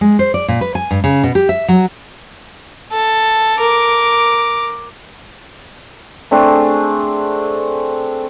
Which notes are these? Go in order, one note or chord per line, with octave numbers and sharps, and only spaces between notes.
G#3
C5
D5
A#2
B4
G#5
G2
C#3
B2
G4
E5
F#3
A4
A#4 D6
A3 C4 D4 G#4